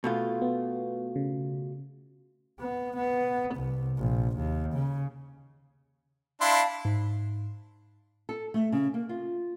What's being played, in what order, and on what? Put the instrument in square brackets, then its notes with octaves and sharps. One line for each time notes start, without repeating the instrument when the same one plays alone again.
[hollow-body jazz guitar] B2 A3 F4
[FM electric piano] B3
C#3
[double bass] B3
B3
C2
A#1
D#2
C#3
[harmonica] D4 E4 C6 [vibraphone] F5 A5 B5
[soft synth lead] G#2
[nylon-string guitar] A4
A3
C#3
A#3
F4